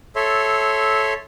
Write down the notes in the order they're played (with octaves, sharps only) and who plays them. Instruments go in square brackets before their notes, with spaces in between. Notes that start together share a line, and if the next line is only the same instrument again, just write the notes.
[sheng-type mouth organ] A4 C#5 E5 C6